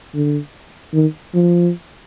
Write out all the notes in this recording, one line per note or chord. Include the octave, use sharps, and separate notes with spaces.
D3
D#3
F3